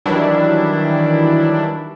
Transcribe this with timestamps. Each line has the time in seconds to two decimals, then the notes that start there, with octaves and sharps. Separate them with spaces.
0.06 D#3 E3 F#3 G3 D4 E4